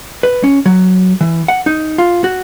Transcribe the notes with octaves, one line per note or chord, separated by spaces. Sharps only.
B4
C#4
F#3
E3
F#5
D#4
F4
F#4